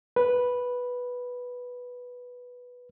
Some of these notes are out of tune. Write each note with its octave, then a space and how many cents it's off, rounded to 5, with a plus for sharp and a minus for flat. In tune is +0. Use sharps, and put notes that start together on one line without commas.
B4 -5